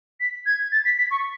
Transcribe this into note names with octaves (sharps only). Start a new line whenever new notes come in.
B6
G#6
A6
B6
B6
C#6